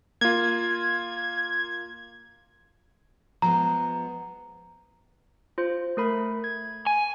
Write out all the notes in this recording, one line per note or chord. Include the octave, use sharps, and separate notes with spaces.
A#3 F4 G#6
F3 G#3 B3 A#5
F4 C5
A3 A#4 B5
G#6
G#5